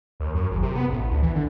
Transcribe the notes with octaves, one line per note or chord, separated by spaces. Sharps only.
D#2
F#2
G#1
C3
B3
A1
D2
E3
D3